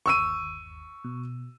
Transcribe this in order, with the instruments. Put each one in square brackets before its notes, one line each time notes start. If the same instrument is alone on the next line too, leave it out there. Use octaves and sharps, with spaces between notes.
[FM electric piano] G1 D#2 [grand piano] C#6 E6 D#7
[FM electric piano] B2